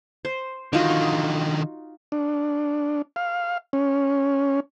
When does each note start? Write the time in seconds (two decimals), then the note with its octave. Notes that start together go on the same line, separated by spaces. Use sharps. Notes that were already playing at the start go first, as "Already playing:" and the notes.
0.25 C5
0.73 D3 D#3 D#4 F4 F#4
2.12 D4
3.16 F5
3.73 C#4